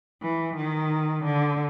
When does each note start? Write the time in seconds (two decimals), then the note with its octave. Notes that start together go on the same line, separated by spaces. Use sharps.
0.22 E3
0.56 D#3
1.24 D3